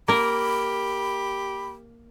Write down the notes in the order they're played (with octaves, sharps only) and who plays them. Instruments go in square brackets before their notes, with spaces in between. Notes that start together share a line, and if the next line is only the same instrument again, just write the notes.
[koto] A#3 A#4 [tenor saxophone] G4 [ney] B5